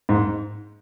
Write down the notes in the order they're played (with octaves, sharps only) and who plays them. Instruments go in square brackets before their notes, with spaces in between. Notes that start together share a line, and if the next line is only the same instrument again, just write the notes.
[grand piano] G#2